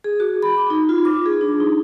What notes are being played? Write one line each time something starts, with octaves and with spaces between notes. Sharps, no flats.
G#4
F#4
B5
D6
D#4
F4
D6
G#4
D4
D#4